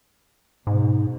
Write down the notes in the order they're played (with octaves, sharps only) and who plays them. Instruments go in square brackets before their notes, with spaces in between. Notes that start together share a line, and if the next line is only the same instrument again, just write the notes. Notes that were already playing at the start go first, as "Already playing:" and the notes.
[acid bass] G#2 [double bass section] B2